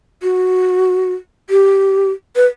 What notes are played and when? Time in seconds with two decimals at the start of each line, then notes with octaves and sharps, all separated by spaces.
0.23 F#4
1.50 G4
2.36 B4